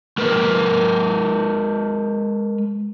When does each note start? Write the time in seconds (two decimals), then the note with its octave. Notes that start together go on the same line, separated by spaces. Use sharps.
0.18 G#3 A#4 B4